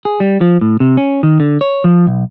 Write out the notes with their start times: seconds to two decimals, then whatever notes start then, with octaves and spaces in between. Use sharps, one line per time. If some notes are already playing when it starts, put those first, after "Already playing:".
0.05 G#4
0.20 G3
0.41 F3
0.61 A2
0.80 C3
0.97 C#4
1.23 D#3
1.40 D3
1.61 C#5
1.84 F3
2.07 B1